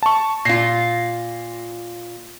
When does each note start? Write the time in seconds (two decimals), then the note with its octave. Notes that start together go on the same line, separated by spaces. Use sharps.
0.03 A5 C#6
0.45 A#2 F4 A#6 C7